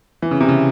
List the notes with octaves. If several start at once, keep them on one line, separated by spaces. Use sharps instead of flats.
E3
C#3
C3
C#3